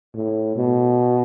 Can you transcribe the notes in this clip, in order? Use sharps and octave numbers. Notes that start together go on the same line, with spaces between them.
A2
B2